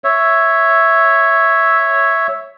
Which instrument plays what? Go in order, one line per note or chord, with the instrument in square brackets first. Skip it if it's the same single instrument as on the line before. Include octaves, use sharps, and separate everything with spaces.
[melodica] C#5 E5